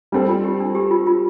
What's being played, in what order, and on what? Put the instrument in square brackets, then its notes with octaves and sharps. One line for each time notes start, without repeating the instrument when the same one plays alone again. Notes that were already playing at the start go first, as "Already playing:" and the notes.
[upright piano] G3 C4 A4 [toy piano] D4
[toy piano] F4
G4
D4
G4
F4
F4